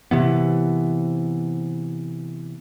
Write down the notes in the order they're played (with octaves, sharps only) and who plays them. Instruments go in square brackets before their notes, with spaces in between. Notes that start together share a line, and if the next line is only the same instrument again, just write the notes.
[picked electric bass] C3 E3 B3